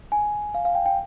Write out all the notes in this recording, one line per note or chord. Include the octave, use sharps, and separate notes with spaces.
G#5
F5
F5
G5
G5